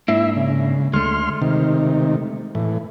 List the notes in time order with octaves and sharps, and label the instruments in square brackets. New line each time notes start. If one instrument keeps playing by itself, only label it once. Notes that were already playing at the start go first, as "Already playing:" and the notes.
[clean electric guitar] G#2 A#3 D4 [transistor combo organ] E4 E5
[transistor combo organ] C#3
[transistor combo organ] D2 C6 F6 [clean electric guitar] G#3 A3
[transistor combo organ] C3 D#3
A2 E3